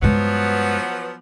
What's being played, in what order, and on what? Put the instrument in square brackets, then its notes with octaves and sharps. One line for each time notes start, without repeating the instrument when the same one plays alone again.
[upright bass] G2 G#3 [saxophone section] F3 F#3 B3